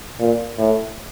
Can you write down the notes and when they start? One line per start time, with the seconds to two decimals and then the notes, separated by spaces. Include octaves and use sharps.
0.20 A#2
0.58 A2